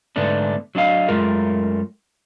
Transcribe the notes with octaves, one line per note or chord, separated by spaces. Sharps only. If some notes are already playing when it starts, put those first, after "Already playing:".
G#2 D3 A3 B3 D4
F#3 D4 D#5 F5
F#2 G#3 A3 F4 A#4